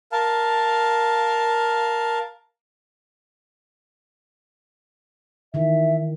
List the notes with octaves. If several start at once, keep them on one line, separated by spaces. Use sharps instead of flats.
A#4 F5 A5
D#3 E3 E5